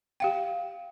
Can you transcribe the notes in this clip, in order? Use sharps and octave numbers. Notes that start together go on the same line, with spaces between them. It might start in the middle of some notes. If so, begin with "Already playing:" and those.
G4 F5 G5